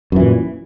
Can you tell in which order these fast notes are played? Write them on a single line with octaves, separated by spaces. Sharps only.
F#2 E3 A#2